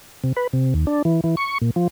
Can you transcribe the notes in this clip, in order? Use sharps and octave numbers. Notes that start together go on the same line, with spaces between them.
C3
B4
C3
D#2
D4
E3
E3
C#6
A#2
F3